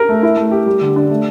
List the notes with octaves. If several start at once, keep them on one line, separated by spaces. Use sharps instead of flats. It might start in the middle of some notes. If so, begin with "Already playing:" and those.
Already playing: A#4
A3
E4
A3
G4
G3
D3
D4
A3